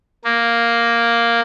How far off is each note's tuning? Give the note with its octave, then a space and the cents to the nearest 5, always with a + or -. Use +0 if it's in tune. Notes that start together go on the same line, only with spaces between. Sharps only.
A#3 +0